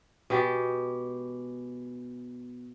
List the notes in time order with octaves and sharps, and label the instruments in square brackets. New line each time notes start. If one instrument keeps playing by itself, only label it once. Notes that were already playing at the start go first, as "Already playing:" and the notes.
[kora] B2 G#3 G4